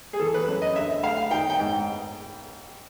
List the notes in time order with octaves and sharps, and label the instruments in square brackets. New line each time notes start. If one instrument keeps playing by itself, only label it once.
[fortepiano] G#4
E3 A4
B4
F#2
D#5
D3 E5
A3 F5
D#3 G5
G5
G#2